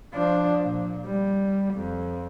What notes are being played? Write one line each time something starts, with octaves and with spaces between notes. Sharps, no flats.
F3 D4
A#2
G3
F2